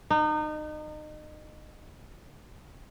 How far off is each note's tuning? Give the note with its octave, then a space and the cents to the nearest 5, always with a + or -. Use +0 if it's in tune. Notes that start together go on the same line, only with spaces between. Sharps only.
D#4 -30